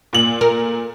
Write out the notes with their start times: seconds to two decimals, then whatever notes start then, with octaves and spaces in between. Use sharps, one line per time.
0.13 A#2 F#7
0.41 A#4